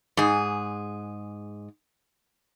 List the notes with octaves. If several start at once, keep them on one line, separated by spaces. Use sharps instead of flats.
G#2 G#4